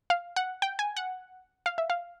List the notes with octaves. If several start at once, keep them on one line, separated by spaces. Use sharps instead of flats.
F5
F#5
G5
G#5
F#5
F5
E5
F5